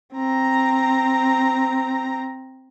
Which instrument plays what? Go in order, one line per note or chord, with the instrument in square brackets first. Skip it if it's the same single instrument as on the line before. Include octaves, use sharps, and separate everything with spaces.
[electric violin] C4 A#5